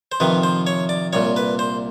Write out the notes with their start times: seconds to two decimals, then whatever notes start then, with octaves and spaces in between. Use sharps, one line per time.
0.12 C5
0.20 F2 C3 D#3 B4
0.43 C5
0.67 C#5
0.89 D5
1.13 C2 A#2 C#5
1.36 B4
1.59 C5